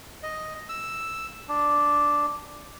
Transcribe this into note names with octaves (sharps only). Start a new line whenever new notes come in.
D#5
E6
D4